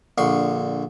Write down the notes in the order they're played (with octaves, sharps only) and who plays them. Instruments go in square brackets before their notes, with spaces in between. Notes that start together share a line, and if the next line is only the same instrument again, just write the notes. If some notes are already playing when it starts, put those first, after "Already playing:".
[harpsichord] A#1 D3 C6 C#6